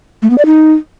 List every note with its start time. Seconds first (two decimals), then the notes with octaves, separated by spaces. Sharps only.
0.22 A3
0.30 B3
0.38 D5
0.46 D#4